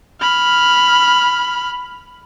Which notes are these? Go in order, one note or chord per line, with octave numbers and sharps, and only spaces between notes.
B5 F6